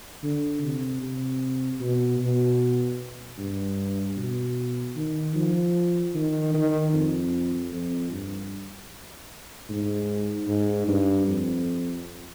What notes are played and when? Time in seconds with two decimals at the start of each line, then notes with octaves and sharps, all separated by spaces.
0.23 D3
0.63 C3
1.02 C3
1.80 B2
2.20 B2
3.38 G2
4.17 B2
4.96 D#3
5.35 F3
6.15 D#3
6.54 D#3
6.93 F2
7.72 F2
8.11 G2
9.69 G#2
10.48 G#2
10.88 G2
11.27 F2